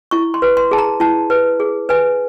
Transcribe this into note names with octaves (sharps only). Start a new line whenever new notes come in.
E4 C#6
C6
B4
C6
G#4 A5
A#5
E4 A5
B4
G#4
B4 G#5